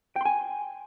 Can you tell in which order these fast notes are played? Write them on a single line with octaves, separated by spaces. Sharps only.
G5 C6 G#5